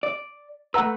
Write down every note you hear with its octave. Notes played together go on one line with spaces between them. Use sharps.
D5
A3 B4 F#5 A#5 E6